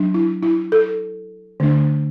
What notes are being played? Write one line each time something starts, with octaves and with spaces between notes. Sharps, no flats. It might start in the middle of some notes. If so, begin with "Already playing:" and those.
Already playing: F#3 D4
E4
E4
A4
D3 A3 D4